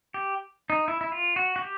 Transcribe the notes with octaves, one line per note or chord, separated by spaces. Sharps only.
G4
D#4
E4
E4
F4
F#4
F#4
G4